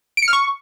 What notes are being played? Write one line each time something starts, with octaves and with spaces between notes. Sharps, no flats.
D7
C#7
F6
C#6